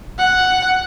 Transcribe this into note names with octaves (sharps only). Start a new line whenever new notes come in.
F#5